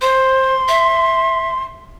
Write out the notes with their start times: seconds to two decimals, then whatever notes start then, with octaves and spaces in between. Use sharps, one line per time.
0.01 C5 C6
0.68 E5